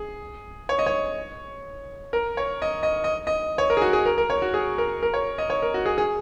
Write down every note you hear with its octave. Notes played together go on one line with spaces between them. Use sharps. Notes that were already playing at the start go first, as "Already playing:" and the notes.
Already playing: G#4
C#5
D#5
C#5
A#4
C#5
D#5
D#5
D#5
D#5
C#5
A#4
G#4
F#4
G#4
A#4
A#4
C#5
F#4
G#4
A#4
A#4
C#5
D#5
C#5
A#4
F#4
G#4
G#4